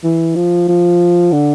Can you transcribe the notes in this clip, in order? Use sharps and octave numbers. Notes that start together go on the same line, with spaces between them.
E3
F3
F3
D3